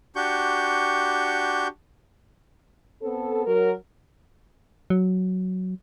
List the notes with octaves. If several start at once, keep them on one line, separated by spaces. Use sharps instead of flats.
D4 F#4 G4 C#6 G6
B3 C4 A4
F#3 A#4
F#3